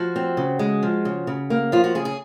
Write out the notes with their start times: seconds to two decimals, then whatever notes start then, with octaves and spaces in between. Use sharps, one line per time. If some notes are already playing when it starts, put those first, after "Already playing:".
Already playing: F3 F#4
0.16 C4
0.37 C#3
0.59 G#3
0.83 F3
1.05 C#3
1.27 C#3
1.50 A#3
1.72 F3 F4
1.84 F#4
1.95 C#3 G#4
2.05 G#4